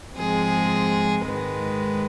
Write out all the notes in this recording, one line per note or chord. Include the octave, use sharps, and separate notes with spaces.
G#2 F3 G#3 C4 G#4
G#2 D#3 G#3 B4